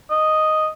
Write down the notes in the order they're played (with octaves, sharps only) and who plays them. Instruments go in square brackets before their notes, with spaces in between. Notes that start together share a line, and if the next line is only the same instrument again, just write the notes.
[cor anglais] D#5